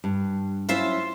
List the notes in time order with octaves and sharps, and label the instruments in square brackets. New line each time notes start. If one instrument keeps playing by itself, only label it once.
[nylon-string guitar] G2
[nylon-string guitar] F#3 C#4 E4 [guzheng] F4 C5 E5